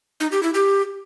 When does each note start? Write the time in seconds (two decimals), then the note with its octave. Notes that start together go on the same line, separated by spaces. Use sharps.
0.20 D#4
0.32 G4
0.43 E4
0.54 G4